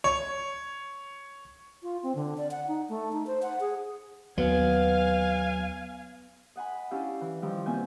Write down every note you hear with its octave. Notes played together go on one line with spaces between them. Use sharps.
C#5
F4
C4
D3
D5
F#5
D#4
A3
D#4
C5
F#5
G#4
D#2 F#3 B3 F5 G#5
D#5 F#5 G#5 B5
C#4 D4 E4 G4 E5 F5
E3
D#3 F3 G3 E4 G4
B2 A#3 C4 E5 G#5 G6